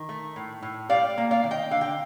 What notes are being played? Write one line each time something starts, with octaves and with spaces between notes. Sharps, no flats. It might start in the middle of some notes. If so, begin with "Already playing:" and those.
Already playing: D#3
A3
A2
A2
G3 D5 F5
A#3
D5 F5
D#3
D#5 G5
D3 F5
G5